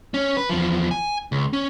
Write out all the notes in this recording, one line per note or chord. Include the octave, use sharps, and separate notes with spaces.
C#4
B4
E2 F3
G#5
C#2
C#4